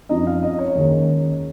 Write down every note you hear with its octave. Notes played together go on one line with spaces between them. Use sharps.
F#2 F3 C4 D#4 D#5
F5
D#5
C#5
D#2 D#3 G#3 C#4